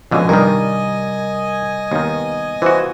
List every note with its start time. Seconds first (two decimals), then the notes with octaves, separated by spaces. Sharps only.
0.11 C#2 B2 D3 F3 D#5 G#5
0.29 G2 C3 D#3 G3 A#4 D5
1.92 D#2 D#3 B3
2.62 E3 F4 F#4 C5